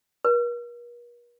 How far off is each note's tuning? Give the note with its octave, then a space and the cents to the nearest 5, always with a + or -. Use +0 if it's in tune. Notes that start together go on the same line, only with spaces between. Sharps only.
A#4 +45